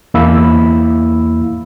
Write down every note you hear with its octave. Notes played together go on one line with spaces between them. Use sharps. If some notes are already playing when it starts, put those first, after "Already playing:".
E2 A#3 E4 F5 B5 E6